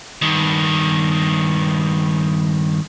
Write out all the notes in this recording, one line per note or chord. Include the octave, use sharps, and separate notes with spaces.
G2 D#3